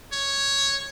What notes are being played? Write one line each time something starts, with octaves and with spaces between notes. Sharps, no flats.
C#5